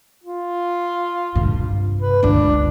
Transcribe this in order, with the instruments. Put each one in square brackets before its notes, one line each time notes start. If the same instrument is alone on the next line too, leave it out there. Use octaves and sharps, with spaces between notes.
[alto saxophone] F4
[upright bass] G2 C3
[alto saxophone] B4
[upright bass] G1 C#2 [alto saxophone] D4